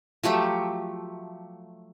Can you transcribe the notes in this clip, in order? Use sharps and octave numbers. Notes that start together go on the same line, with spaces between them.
F3 F#3 A3 G4